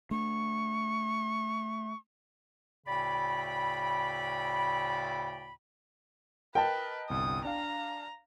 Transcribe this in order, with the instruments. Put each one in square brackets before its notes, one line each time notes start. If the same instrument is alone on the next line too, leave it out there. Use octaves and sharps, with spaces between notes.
[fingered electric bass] A3 D4 [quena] C#6
[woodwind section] D2 A2 C#3 D5 G5 B5
[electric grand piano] A#4 D#5 [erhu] B4 [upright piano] G5 A5
[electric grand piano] G1 C2 [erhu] D#6
[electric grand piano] D4 F5 [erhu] A#5